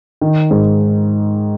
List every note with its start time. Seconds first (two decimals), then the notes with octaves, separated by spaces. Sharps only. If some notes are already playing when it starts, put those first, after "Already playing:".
0.21 D#3
0.51 G#2